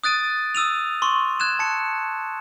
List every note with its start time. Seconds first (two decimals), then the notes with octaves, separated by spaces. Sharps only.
0.04 D#6 F#6 A6 D7 D#7
0.55 D#6 E6 D#7 F7
1.02 C6 C#6
1.40 F#6 G#6 E7
1.59 A5 C#7